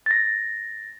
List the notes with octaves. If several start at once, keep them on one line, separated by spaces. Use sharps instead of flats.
A6 A#6